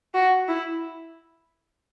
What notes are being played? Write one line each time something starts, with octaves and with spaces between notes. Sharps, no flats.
F#4
E4